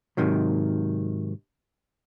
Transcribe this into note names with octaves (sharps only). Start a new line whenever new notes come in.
G#2 C3 D#3 F#3